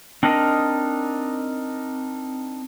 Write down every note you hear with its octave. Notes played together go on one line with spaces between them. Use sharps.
C4 D4 D#4 A#4 D#5